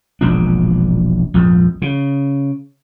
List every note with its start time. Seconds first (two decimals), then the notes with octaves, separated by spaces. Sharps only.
0.21 E1 A#1 G#2 D4
1.34 A#1 F2 G#2
1.82 C#3